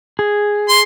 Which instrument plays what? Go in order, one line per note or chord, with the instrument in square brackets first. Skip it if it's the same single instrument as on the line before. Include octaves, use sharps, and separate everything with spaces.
[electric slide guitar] G#4
[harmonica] C6